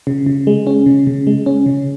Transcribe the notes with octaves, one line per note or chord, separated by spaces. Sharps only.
C#3
C#3
G#3
C#4
C#3
C#3
G#3
C#4
C#3